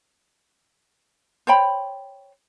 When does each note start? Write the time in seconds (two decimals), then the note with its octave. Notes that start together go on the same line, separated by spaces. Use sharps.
1.47 C5 C#5 G5 B5